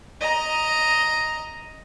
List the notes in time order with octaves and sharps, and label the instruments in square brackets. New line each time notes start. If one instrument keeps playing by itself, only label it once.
[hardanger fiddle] D#5 A#5